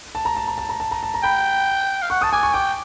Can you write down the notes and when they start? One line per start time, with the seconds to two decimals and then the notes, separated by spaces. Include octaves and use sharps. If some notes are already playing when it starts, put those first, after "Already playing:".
0.15 A5
0.25 A#5
0.37 A5
0.48 A#5
0.58 A5
0.69 A#5
0.80 A5
0.91 A#5
1.03 A5
1.14 A#5
1.23 G5 B5
2.02 F5
2.10 F#5 C#6
2.22 A5 D#6
2.32 G#5 D6
2.43 C#6
2.54 G5 D6